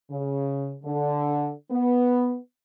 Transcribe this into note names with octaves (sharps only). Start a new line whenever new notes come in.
C#3
D3
B3